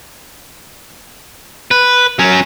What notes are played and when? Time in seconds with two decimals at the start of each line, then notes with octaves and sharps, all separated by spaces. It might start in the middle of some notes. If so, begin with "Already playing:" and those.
1.71 B4
2.19 F#3 C#4